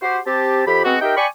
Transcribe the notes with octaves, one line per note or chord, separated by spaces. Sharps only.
F#4 G4 C5
C4 G4 A5
F2 G4 B5
G#3 B3 C4 F#4
D#4 G4 A#4 E5 G5
D5 G5 G#5 B5 C#6